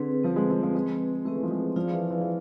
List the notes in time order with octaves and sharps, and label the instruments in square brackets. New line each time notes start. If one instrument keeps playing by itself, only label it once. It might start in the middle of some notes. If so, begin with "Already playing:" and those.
Already playing: [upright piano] D3 [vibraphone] C4 G#4 B4
[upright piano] F3 [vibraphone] C4 G#4 B4
[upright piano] G#3
F3
F3
[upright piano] G#3 [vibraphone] C4 G#4 B4
[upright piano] A3 [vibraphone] C4 G#4 B4
[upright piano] E3
F3
G#3
[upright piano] F3 [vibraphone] F4 G#4 D5 F5
[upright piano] E3
E3
E3